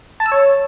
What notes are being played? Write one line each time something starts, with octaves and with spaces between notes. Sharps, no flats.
A5
E6
C#5